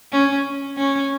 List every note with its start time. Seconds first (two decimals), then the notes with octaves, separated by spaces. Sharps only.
0.12 C#4
0.77 C#4